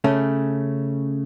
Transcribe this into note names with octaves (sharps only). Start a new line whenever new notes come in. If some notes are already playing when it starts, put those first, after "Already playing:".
C#3 A3 C#4